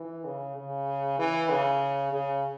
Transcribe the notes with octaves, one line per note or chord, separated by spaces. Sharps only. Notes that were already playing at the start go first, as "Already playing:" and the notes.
Already playing: E3
C#3
C#3
E3
C#3
C#3